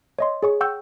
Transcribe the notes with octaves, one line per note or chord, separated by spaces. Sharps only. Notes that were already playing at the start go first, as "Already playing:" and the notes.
C#5 D#5 C6
G#4 C#5 C#6
F#5 G5 C#6 E6 G6